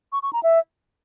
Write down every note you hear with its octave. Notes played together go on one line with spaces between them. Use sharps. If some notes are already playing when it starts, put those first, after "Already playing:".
C#6
C#6
A#5
E5